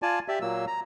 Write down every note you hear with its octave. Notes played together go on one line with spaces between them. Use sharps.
F4 D5 G#5 A5
G4 D5 E5
A#2 F#3 A#3 E6
A#5